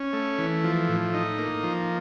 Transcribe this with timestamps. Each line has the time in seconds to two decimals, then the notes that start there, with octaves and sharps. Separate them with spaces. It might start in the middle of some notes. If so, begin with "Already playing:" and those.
Already playing: C#4
0.13 A3
0.38 E3
0.64 F3
0.88 A2
1.14 D#4
1.39 A#3
1.63 F3